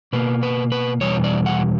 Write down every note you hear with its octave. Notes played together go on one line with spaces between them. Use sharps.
B2 A#3 B4
B4
B4
E2 B2 G3 C#5
D5
F#5